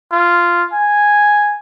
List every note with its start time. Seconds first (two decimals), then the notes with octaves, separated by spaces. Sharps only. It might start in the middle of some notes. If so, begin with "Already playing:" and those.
0.12 F4
0.73 G#5